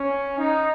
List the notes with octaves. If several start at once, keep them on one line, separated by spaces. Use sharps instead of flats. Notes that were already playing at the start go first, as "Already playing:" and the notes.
Already playing: C#4
D#4